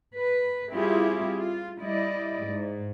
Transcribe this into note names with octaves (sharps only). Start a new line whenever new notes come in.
B4
G3 C4 E4 F4 G4 G#4
F4
G3 E4 D5 D#5
G#2